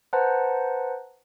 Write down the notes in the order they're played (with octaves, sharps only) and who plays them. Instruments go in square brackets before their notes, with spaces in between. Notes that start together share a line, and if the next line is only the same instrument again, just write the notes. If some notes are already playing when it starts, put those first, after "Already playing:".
[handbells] B4 C5 F#5 A5 A#5